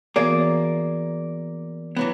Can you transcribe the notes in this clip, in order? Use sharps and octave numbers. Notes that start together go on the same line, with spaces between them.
E3 A#3 B3 F#4 G#4 D5
E3 F#3 B3